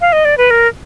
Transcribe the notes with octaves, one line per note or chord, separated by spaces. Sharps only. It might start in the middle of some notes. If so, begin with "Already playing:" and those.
F5
D#5
D5
B4
A#4